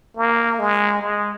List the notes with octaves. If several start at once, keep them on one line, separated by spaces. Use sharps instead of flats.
A#3
G#3
G#3